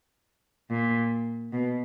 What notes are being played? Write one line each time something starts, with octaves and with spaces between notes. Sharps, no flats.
A#2
B2